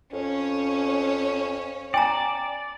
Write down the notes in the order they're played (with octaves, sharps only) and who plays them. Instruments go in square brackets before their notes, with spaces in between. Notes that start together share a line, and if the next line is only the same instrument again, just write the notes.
[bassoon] F2 [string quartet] C#4 C#5
[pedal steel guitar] D5 [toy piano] G5 G#5 A#5